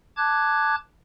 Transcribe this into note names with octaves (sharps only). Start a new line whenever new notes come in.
A5 D6 F#6 G#6